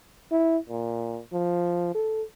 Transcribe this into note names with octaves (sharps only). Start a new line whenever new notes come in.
E4
A#2
F3
A4